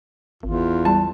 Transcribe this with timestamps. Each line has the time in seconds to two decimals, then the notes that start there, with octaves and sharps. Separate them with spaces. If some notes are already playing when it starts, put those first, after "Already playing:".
0.43 G#1 E2 F4
0.85 G3 A5